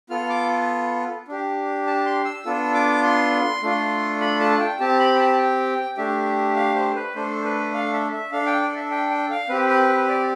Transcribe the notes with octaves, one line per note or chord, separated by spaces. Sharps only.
B3 F4 A4 F6
D6
D4 G4
A5
C6
E6
B3 D4 F4 A4 E6
D6
C6
A3 D4 F4 A4
B5
A5
G5
C4 G4 A5
B5
G5
A5
G5
A3 D4 G4 E5
F5
C5
B4
A3 D4 A4 C5
B4
F5
E5
E5
D4 A4 F5
G5
D5
E5
G5
G5
F5
C4 G4 B4
B4
B4
D5